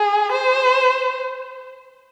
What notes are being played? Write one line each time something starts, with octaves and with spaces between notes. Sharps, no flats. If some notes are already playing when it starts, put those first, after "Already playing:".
Already playing: G#4
C5